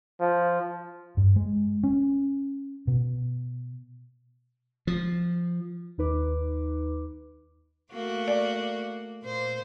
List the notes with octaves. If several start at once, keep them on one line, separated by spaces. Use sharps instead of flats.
F3
G2
G#3
C#4
B2
F3
D#2 D#4 B4 D6
A3 A#3 F#4
D5
A#2 C5